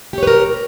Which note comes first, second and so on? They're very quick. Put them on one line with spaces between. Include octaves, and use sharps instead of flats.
G4 C#5 B4 A#4